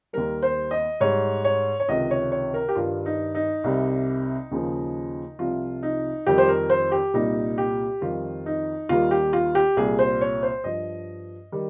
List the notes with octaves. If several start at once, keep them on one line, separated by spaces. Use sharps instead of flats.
D#2 D#3 G3 A#4
C5
D#5
G#2 G3 C#5
C#5
C#5
C#2 C3 D#3 D#5
C#5
C#5
A#4
G4
G2 D#3 G3 F4
D#4
D#4
C2 C3 G3
D#2 C#3 F3
C2 C3 F3 F4
D#4
F2 D#3 G3 G4
C5
A#4
C5
G4
C2 A#2 G3 D#4
G4
F2 D#3 G3 F4
D#4
D#2 D#3 G3 F4
G4
F4
G4
C2 A#2 G3 G#4
C5
C#5
C5
G2 F3 D#5
D#3 G3